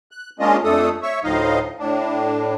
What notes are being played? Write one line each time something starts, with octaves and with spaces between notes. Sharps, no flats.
F#6
G#3 A#3 C#4 D4 F4 D#5
F2 A3 D4 A4 D#6
C#5 E5 C#6
D2 A2 F3 D#4 D#5 F5
A2 D4